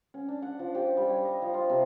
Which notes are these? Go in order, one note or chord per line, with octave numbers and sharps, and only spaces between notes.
C#4
D4
F#5
F3
G4
G3
C#5
D#5
F3
F4
C3